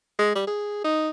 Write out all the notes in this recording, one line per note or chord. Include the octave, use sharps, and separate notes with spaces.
G#3
G3
G#4
D#4